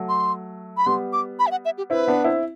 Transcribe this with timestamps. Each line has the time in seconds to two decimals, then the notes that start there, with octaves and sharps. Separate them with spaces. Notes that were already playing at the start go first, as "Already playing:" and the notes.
Already playing: F#3 A3
0.09 C6
0.77 B5
0.86 G3 B3 C6
1.13 D6
1.39 B5
1.47 E5
1.51 F#5
1.65 E5
1.78 G4
1.90 C4 E4 B4
2.08 B3 D4
2.24 C4 E4